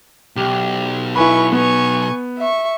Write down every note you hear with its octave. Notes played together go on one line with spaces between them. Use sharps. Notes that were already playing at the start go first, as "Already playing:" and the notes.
B1 G4
E4 B4 G#5 B5 C#6
B3 G#5 C#6
E5 C#6